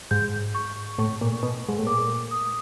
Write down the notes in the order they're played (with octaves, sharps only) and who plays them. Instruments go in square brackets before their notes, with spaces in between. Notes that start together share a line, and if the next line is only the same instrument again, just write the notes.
[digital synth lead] G#2 [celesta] G6
[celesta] C#6
[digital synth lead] A2 [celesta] C#6
[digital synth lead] A#2
B2
G#2
A2
[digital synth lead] A#2 [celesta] D6
[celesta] D#6